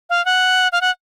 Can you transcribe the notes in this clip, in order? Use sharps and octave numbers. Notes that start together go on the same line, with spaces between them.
F5
F#5
F5
F#5